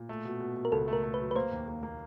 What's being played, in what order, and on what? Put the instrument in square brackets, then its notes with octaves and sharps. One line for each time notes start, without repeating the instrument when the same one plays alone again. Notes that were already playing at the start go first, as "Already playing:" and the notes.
Already playing: [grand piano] A#2
A3
B2
B2
B2
[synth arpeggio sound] A#4
[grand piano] C#2 [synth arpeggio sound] A4
[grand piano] A3
[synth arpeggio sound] A#4
[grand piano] A3
[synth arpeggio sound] B4
[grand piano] F#3
[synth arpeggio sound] B4
[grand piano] A#3 [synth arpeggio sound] C5
[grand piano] D#2
A#3
A#3